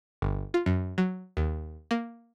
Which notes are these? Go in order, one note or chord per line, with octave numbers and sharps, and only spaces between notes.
G1
F4
F#2
F#3
D#2
A#3